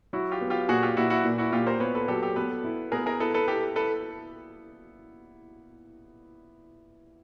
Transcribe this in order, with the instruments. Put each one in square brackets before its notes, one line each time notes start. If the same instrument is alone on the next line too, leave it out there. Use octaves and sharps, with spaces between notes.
[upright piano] F#3 [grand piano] E4 F#4
[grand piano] F4 G4
[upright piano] B3
[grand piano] F4 G4
[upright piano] A#2 [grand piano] F#4 G#4
[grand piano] F4 G4
[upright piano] A#2 [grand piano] E4 F#4
[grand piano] E4 F#4
[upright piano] A#2
[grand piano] E4 F#4
[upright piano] A#2 [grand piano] F4 G4
[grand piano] A#4 C5
[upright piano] B3 [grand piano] B4 C#5
[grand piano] A4 B4
[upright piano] F#3 [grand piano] G4 A4
[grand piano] G4 A4
[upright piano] B3 [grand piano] A4 B4
[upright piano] E4
[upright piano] B3 [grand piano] G#4 A#4
[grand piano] G#4 A#4
[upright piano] E4 [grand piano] A4 B4
[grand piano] A4 B4
[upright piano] E4 [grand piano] G4 A4
[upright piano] E4 [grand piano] A4 B4